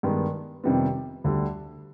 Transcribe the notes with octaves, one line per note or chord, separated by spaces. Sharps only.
G2 D#3 G#3 B3
F2 C3 D#3 G3 B3
D2 D3 G3